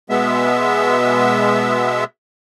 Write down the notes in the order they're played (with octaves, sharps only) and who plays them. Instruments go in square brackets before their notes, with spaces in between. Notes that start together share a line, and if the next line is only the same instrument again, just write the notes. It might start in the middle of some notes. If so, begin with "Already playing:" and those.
[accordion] B2 G#3 B3 E5